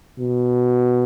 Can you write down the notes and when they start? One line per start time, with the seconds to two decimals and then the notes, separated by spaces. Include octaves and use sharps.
0.19 B2